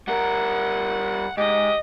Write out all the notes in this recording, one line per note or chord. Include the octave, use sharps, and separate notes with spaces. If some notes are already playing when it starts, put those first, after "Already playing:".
G3 A#4 F#5
G#2 G4 D#5